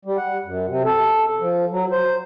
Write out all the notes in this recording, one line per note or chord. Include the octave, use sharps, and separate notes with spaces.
G3
F#5
F#2
C3
A4
F3
F#3
C5